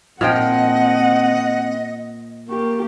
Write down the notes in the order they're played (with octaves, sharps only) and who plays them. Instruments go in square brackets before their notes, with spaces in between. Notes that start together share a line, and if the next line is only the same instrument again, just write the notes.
[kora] A#2 F3 G5 [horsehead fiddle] C4 F#5 [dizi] D#5
[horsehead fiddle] A#3 G4 [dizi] C#6